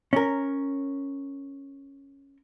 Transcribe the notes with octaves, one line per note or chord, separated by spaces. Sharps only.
C#4 A#4